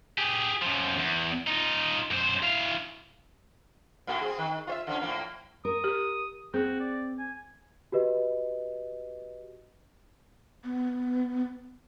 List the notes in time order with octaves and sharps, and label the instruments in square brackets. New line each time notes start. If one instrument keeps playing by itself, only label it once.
[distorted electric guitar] G4 G#4
F#2 F3
E2
D#4 F4
F#2 C5
E3 F5
[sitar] A2 A#3 F#4
C4 G#4
D#3
F4 C5 E5
D3 F3 C#4
A2 F3 A#3
[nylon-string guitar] A#4 [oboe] D#6
[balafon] G4
[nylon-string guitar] C4 [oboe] F#4 [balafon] G#4
[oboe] D5
G#5
[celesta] F#4 G4 B4 D#5
[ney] B3